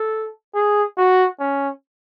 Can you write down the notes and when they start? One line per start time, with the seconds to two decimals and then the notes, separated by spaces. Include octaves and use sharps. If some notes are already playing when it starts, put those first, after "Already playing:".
Already playing: A4
0.54 G#4
0.98 F#4
1.40 C#4